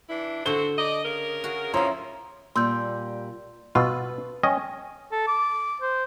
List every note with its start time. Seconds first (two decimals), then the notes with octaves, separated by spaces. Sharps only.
0.09 E3 D4 E4
0.46 D3 C4 F#4 A4 C5 G7
0.78 D5 D#5
1.05 C#3 A#4
1.44 F#4 G#4
1.74 C#3 F3 C#4 E4 F4 A#5 C6
2.56 A#2 G3 C6 E6 G6
3.75 B2 F4 B4 E6 A6
4.43 C#4 D#5 G5 G#5 C#6
5.12 A4
5.27 D6
5.81 C5